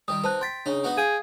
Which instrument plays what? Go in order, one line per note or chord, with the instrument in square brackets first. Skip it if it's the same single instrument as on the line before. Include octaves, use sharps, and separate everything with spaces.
[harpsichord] D#3 G3 [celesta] D#6
[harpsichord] C3 D#4 [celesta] B4 A5 F#6
[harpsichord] G5 [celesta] C6 A6 B6
[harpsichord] C#3 D#4 [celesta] D4
[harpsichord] B3 D#4 F#4
[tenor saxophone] G#4 [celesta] F5 [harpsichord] G5